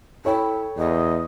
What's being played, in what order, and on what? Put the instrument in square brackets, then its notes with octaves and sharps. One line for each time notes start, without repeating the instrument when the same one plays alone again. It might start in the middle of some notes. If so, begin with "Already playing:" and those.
[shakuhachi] E4 [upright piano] A4 C#5 G5
[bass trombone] E2 [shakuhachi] D#5